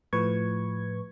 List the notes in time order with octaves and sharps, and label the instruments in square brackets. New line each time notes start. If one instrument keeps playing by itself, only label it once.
[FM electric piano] A2 F3 B4 C#6 G#6